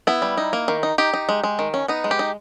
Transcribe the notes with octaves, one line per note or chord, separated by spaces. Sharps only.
B3 E4
G3
D#4
A#3
D#3
D#4
D#4 G4
D#4
G#3
G#3
D#3
C#4
B3 D#4
G#3
G4
D#4